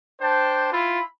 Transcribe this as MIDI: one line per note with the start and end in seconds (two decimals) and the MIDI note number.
0.21 0.70 62
0.21 0.70 72
0.21 0.70 79
0.21 0.70 81
0.71 1.01 64
0.71 1.01 65
0.71 1.01 83